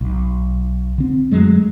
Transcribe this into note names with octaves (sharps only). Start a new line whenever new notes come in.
B1
D3 C4
F#2 F#3 G#3 A3